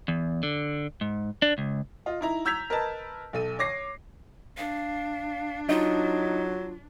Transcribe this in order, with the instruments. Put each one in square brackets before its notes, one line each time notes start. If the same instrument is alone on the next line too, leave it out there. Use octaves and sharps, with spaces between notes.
[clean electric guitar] E2
D3
G#2
D4
C#2
[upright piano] F4 D#5
D#4 E4 A#5
A#5 E6 G6 G#6 B6 F7
A#4 B4 D#5 A5
B1 A4 D#7
C#5 D6 A#6 C7
[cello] D4 [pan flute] F5
[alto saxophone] F#3 [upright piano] D#4 [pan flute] F4